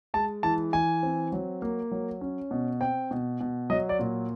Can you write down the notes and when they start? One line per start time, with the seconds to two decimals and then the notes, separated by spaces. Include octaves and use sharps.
0.14 G#3 A5
0.43 E3 A5
0.73 E3 G#5
1.03 C4
1.32 F#3
1.62 A#3
1.92 F#3
2.21 C#4
2.51 B2
2.81 C4 G5
3.11 B2
3.40 B2
3.70 F#3 D#5
3.89 D5
3.99 A#2